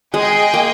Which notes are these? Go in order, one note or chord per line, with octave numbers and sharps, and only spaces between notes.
G#3 G#4 D#5 G5
A#3